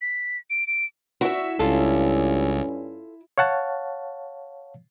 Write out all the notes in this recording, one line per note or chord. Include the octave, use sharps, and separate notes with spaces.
B6
D7
D7
E4 F#4 E5
C#2 G2 C#4 F4 A4
C#5 F5 F#5 A5